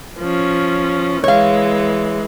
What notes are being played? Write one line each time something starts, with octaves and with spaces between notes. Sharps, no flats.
F3 C#4
E3 G#3 C#5 F5